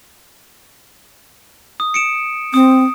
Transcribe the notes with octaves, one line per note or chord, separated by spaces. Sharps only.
D#6
C#7 D7 E7
C4 D#6